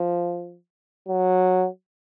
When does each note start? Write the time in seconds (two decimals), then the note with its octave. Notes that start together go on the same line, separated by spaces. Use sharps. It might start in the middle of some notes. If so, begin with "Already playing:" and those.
Already playing: F3
1.08 F#3